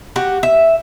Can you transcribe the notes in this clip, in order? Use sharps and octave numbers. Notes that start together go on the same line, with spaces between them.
F#4 G4
E5